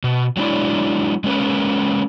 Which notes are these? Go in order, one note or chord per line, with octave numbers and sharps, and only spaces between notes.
B2
F#3 G#3 D4 E4 D5
G#3 A#3 C#4 A#4 B4